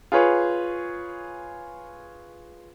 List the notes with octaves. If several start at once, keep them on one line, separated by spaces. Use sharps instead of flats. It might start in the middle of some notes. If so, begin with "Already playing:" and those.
F4 G#4 B4 C#5